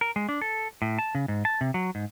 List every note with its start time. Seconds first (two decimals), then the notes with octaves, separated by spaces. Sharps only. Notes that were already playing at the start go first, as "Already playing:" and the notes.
0.01 A#4
0.16 G#3
0.29 D4
0.42 A4
0.82 A2
0.99 A5
1.15 C#3
1.28 G#2
1.45 A5
1.61 C3
1.74 F#3
1.95 G#2